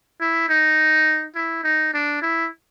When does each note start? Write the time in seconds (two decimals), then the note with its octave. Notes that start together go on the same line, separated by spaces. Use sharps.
0.21 E4
0.49 D#4
1.35 E4
1.64 D#4
1.93 D4
2.22 E4